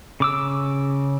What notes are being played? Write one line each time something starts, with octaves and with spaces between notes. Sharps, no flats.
C#3 D6 E6